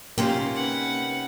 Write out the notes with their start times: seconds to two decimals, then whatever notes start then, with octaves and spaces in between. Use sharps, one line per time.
0.18 C3 A#3 C#4 D#4 F4 C6
0.55 B4 F#5